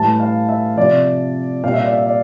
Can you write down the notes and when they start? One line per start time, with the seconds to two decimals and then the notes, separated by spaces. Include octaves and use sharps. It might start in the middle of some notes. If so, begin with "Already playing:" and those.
Already playing: A2 E3 G3 A5
0.20 F5
0.49 E5
0.77 C3 F3 D5
1.63 A#2 G3 F5
1.74 E5
1.83 D5
1.93 E5
2.06 D5